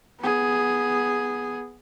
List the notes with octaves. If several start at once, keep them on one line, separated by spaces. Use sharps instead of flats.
B3 G#4